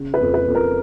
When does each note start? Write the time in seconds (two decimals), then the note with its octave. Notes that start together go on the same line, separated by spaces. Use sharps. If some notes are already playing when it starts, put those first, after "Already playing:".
Already playing: C#3
0.14 B4
0.21 F2
0.34 B4
0.48 F2
0.55 A#4